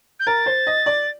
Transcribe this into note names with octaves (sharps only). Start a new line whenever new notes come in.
G6
A#4 A6
C5
D#5
D5